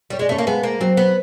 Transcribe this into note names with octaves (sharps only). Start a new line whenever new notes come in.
G3 C#5
G#3 D5
A3 C#4 C#5
A#3
G#3 B3 G#4
A#3
F#3 C4 F#4
B3